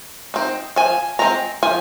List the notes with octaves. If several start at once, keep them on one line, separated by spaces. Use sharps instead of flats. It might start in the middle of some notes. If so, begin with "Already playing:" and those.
C4 D#4
F3 G#5
G#3 C4 A#5
F3 G#5